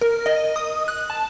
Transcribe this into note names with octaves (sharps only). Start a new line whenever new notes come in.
A#4
D#5
D#6
F#6
A5